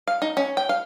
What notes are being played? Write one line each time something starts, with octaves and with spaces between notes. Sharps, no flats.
F5
D#4
C#4
G5
F5